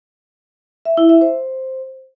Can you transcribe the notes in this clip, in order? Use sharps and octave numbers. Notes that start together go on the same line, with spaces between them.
E5
E4
E5
C5